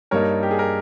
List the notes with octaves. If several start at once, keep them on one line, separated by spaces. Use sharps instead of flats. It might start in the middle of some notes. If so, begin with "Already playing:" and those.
G2 G3 A#3 D#4 A#4 C#5
G4
G#4
A#4